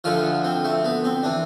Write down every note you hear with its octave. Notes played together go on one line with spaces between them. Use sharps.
D2 D3 F3 F4
C4
A3
B3
C4
E3 D4